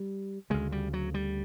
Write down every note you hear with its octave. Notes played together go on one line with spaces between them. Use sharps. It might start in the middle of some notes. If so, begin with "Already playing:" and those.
Already playing: G3
D2 C#3 G#3
G3
F#3
G3